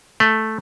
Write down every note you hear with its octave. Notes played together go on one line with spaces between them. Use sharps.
A3